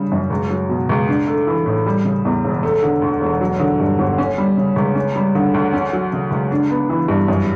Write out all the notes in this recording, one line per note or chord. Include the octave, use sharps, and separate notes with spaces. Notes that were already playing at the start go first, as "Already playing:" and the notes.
Already playing: C#3 G3 D4
F#2
C#2
F#3
B2
C#2
D4
A3
E3
A2
G3
C#3
E2
E1
A3
D3
D2
E1
F#3
D3
G2
G1
C#4
G3
C#3
C#2
C#4
G3
D3
D2
C#4
F#3
C#3
C#2
D4
B3
E3
G2
F#2